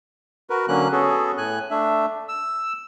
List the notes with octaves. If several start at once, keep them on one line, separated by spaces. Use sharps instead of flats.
F#4 A#4 B4
D3 F#3 A#3 C#4 F#6
B3 C#4 F#4 G#4 A4
A2 G#5 F#6
A3 D4 E5
E6